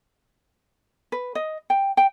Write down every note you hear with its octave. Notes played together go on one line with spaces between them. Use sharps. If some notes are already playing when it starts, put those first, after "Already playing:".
B4
D#5
G5
G5